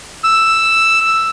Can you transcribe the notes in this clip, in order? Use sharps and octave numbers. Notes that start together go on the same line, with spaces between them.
E6